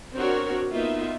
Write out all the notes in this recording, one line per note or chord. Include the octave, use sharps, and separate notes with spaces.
C4 D4 F#4 A#4 C#5
A#3 B3 D#4 F4 E5